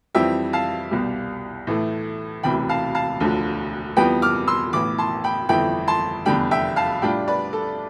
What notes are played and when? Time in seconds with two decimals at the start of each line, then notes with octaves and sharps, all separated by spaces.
0.15 F2 E3 G3 C4 E4 E5 G5
0.53 F5 A5
0.91 C2 B2 G3
1.67 A2 E3 A3
2.43 E1 D2 C3 E3 G5 B5
2.69 F5 A5
2.95 F5 A5
3.20 E1 D2 D3 F3
3.96 F2 E3 G3 B3 G5 B5
4.22 D6 F6
4.47 C6 E6
4.73 A1 A2 E3 B3 B5 D6
4.98 A5 C6
5.24 G5 B5
5.49 G1 F2 E3 A3 E4 G5 B5
5.88 A5 C6
6.25 F1 E2 D3 G3 G5 B5
6.51 E5 G5
6.76 F5 A5
7.02 A2 G3 D4 F4 G5 B5
7.28 B4 D5
7.53 A4